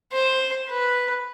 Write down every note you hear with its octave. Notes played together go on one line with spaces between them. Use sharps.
C5
B4